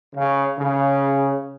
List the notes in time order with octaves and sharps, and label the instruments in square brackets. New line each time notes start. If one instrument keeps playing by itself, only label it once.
[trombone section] C#3
C#3